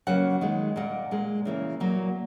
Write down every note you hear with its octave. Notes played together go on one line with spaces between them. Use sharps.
C#3 F#3 A#3 F#5
D#3 G#3
A#2 A#3 F#5
A#2 G#3
C#3 E3 A#3
A#2 F#3 A#3